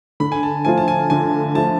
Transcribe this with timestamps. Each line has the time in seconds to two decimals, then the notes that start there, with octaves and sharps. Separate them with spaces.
0.20 D3 B5
0.32 G#5
0.43 A5
0.65 F3 A3 F4 G#5
0.78 A5
0.88 G#5
1.10 D3 G#5
1.55 F3 A3 F4 A5